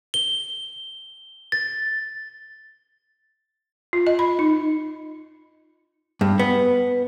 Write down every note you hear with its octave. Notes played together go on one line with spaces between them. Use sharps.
G7
A6
F4
D#5
B5
D#4
G2
B3